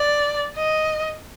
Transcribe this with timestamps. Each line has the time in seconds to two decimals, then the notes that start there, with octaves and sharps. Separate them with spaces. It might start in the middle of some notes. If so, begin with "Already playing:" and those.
Already playing: D5
0.57 D#5